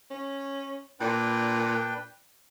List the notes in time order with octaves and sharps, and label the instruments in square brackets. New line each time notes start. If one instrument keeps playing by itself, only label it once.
[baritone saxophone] C#4
[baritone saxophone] A#2 [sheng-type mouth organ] D4 B4 G5